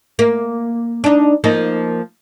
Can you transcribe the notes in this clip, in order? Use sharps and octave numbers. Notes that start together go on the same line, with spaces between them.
A#3
D4 D#4
F3 A#3 D#4